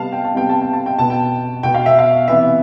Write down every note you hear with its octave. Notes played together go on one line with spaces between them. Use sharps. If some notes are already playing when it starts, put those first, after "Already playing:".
Already playing: C3 G3 B3 F5 A5
G5
A5
C3 G3 B3 G5
A5
G5
A5
G5
B2 B3 A5
G5
B2 B3 G5
F5
E5
F5
C3 E3 B3 E5